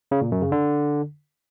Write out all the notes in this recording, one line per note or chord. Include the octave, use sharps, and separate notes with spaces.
C#3
A#2
F#2
C#3
D3